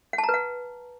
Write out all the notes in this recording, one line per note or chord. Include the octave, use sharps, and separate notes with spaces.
F#5
A5
A#5
B4
F#5